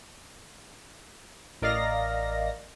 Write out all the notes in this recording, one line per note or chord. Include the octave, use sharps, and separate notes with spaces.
A1 A#4 D5 D#5 F5 A#6